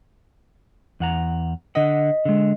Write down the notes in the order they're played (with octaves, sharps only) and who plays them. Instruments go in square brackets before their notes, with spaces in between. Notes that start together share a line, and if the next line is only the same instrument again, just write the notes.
[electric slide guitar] E2 F#5 A#5
[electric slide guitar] D3 F#5 [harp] D#5 B6
[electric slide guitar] D3 G#3